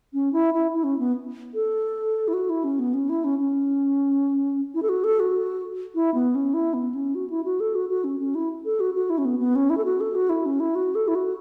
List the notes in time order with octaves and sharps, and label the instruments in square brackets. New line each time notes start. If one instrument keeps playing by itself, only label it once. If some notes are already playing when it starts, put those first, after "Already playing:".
[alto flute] C#4
E4
E4
E4
C#4
B3
A4
E4
F#4
E4
C#4
B3
C#4
E4
C#4
C#4
E4
A4
F#4
A4
F#4
E4
B3
C#4
E4
B3
C#4
F#4
E4
F#4
A4
F#4
F#4
C#4
C#4
E4
A4
F#4
F#4
E4
C#4
B3
B3
C#4
E4
A4
F#4
A4
F#4
E4
C#4
E4
F#4
A4
E4
F#4